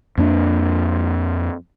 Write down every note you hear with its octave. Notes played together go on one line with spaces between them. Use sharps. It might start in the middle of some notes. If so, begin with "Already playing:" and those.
F2 A#3 D4